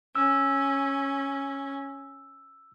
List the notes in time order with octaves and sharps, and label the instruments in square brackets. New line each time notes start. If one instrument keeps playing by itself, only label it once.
[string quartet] C#4 [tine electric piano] E6